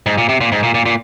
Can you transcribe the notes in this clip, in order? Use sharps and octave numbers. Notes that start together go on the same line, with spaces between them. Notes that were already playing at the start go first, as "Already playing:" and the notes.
G#2
A#2
C3
A#2
G#2
A#2
A#2
A#2